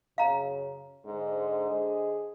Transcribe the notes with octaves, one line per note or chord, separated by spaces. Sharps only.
F#2 C#3 F5 A#5
G#2 D3 C5 D#5
G#4